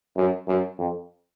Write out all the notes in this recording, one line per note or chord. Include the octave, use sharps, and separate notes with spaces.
F#2
F#2
F2